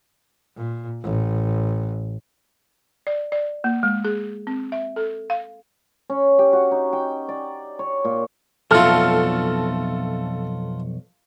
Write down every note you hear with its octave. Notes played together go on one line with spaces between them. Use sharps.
A#2
A1
D5
D5
A#3
G#3
G#4
C4
E5
A4
F5
C#4
G4
F#4
D#4
G5
D5
C#5
A#2
B1 F2 A3 F4 F#4 A4 F6